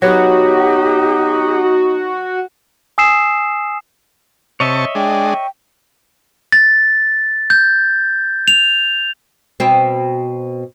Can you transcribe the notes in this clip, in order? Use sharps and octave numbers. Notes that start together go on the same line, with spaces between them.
F#3 B3 D#4 F#4 G4
G#5 D#6 E6 C7 E7
C3 C#5 D#5 E5 A5 C#6
G#3 D4 G5
A6
G6
F7
B2 C4